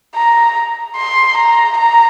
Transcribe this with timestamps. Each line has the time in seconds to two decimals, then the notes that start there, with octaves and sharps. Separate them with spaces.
0.15 A#5
0.96 C6
1.37 A#5
1.77 A#5